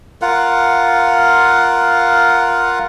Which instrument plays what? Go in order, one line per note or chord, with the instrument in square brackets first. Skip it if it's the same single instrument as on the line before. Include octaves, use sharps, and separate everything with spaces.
[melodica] F4 A#4 F5 F#5